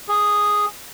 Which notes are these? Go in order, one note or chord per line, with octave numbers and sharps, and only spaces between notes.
G#4